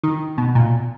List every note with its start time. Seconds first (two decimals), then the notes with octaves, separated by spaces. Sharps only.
0.04 D#3
0.38 B2
0.55 A#2